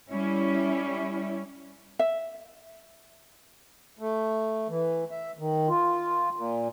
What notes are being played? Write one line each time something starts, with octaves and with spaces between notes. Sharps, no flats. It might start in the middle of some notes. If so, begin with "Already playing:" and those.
G3 C#4 E4
E5
A3
E3
E5
D#3
F4
A#2